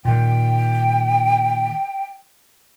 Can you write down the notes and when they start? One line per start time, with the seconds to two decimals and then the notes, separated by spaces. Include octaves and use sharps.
0.05 A#2 D#3 G5